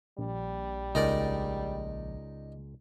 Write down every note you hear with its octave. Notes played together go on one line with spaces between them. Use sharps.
A#1 G3
C#2 D#4 A#4 D5